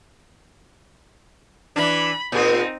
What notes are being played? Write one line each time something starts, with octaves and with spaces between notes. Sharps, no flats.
E3 D4 B5
A#2 C4 D#4 G#4